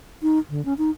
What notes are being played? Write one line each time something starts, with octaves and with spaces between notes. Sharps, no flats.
D#4
D3
C#4
D#4